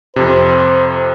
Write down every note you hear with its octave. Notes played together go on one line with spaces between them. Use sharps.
F2 C3 C5